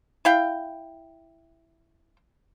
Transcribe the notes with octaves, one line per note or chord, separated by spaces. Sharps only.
E4 F5 G5